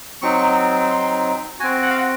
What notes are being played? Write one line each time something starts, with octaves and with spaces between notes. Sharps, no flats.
F#3 C4 D#4 C#6
C6
C4 F#4 G#5
F#5
F5
F#5